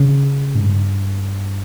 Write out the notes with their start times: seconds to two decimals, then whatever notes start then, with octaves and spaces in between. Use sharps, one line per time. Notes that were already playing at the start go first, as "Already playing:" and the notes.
Already playing: C#3
0.55 G#2
0.62 G2